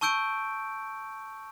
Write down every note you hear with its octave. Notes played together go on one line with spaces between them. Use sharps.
A5 C#6 E6 G6 D7